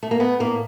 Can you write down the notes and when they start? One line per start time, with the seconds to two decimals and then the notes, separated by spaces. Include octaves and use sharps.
0.03 A3
0.11 A#3
0.20 A3 B3
0.40 A2 A#3